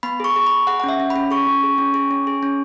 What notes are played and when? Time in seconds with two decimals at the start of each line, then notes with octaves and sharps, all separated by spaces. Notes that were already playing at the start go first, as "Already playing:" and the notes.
0.03 B3 B5
0.20 G#4 C#6
0.36 G#4
0.47 G#4 B5
0.67 G#4 F#5
0.80 F#5
0.84 C#4 E5
1.00 C#4
1.10 B5
1.16 C#4
1.31 G#4 C#6
1.47 C#4
1.63 G#4
1.78 C#4
1.94 G#4
2.11 C#4
2.27 G#4
2.43 C#4